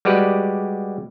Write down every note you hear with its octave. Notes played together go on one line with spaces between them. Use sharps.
G3 G#3 F#4 G4 B4 D5